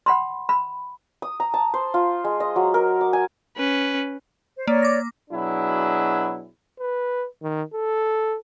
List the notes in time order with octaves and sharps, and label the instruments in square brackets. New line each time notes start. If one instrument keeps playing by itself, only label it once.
[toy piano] F#5 B5 C6
B5
[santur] D#6
A#5
A5
C5
F4
G#3
D#5
F#3
A#4
D6
G#5
[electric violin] C#4 B4
[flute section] C5
[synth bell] A#3 [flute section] C#5 D5
[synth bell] D6 A#6
[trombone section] B2 F#3 D4 E4 G#4
[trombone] B4
D#3
A4